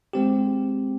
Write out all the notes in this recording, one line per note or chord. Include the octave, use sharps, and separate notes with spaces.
G#3 C4 G4